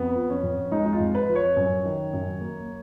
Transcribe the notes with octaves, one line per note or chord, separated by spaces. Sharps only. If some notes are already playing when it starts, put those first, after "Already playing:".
Already playing: F2 B3
F3
C#4
F2
G#3 D#4
D#4
F4
F2
B4
F3
C#5
F#2
D#3
F#2
A#3